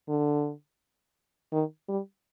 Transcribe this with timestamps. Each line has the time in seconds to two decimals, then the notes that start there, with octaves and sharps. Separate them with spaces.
0.09 D3
1.53 D#3
1.89 G3